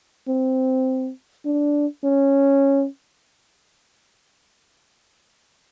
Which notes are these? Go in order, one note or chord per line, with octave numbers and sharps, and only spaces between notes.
C4
D4
C#4